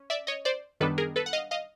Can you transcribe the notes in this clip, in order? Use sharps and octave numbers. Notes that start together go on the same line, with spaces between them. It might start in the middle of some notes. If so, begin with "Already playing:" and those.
Already playing: C#4
D5 E5
C#5 D#5
C5 D5
F#2 D#3 G3 B3 D4 A4 B4
G#4 A#4
A4 B4
F#5
D#5 F5
D#5 F5